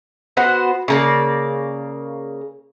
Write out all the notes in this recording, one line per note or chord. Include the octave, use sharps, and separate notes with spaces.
B3 F#4 C5 F#5
C#3 A#3 D5